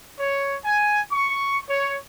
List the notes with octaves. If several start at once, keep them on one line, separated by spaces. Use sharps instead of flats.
C#5
G#5
C#6
C#5